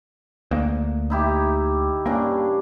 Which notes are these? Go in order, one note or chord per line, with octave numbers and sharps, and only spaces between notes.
D2 A#3
D#4 E4 G4
G2 C#3 A#3 D4